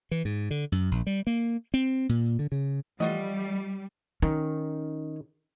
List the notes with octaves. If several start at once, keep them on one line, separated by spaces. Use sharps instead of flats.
E3
G#2
D3
F#2
A#1
G3
A#3
C4
A#2
D3
C#3
E3 F3 G3 A3 F4 F#4 D#5
D#3 C#4